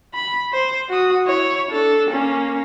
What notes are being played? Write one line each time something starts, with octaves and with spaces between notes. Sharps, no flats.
B5
C5
F#4 D#6
E4 C#5
D4 A4
A#3 C#4